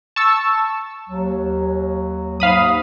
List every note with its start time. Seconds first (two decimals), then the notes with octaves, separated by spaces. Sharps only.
0.16 A5 C#6 E6
1.09 D#2 F#3
2.40 D#2 G#2 F5 B5 D#6